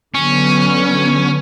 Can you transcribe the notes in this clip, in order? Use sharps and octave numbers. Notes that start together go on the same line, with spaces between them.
D3 F#3 B3 C#4